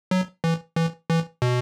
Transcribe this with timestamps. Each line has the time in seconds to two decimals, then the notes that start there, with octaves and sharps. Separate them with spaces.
0.11 F#3
0.44 E3
0.76 E3
1.10 E3
1.42 B2